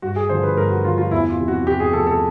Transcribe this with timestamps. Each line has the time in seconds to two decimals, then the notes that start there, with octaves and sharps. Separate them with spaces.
0.02 G2 F#4
0.16 G#4
0.29 D3 F3 C5
0.43 B4
0.57 G2 A#4
0.71 F#4
0.85 D3 F4
0.88 F3
0.98 F4
1.11 E2 E4
1.30 F4
1.39 C3 F3
1.48 F#4
1.66 E2 G4
1.80 G#4
1.93 C3 F3 A4
2.07 A4